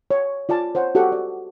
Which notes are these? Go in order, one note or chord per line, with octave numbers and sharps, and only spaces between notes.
C#5
F4 D5 G#5 A5
C5 C#5 F#5
F#4 G4 A4 F#5
D5